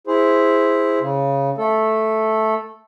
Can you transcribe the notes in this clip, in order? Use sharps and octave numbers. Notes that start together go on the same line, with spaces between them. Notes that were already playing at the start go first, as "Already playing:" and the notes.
E4 G#4 C5
C#3
A3 A4